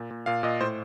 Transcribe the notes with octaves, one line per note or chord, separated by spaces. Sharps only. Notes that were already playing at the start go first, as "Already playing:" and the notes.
Already playing: A#2
A#2
A#2 F5
A#2 D#5
A2 C5